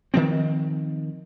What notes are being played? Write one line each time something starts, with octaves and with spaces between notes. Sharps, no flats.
D#3 F3 C4